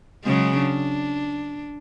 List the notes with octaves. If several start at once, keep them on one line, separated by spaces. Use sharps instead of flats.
C#3 F#3 G#3
D4